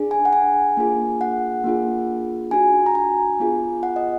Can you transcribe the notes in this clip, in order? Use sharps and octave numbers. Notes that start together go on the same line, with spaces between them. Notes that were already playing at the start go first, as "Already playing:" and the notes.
Already playing: D4 G#4
G#5
F#5
G#5
A#3 D4 F4 G#4
F#5
A#3 D4 F4 G#4
D4 F#4 G#5
A#5
G#5
B3 F4 G#4
F#5
D#5